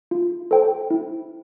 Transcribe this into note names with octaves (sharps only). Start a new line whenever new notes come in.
F4
A4 C5 G5
E4